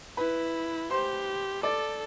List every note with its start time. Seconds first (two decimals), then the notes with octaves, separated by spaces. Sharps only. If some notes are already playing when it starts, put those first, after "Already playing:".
0.17 E4 B4 B5
0.91 G4 C5 C6
1.63 A4 D5 D6